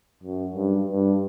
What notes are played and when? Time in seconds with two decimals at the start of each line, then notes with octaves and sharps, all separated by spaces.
0.23 F#2
0.55 G2
0.89 G2